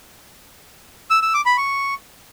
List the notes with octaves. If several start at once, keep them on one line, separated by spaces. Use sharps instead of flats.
E6
E6
D6
B5
C#6